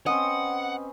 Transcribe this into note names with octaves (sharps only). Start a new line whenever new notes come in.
C4 C#4 B4 D#5 F#5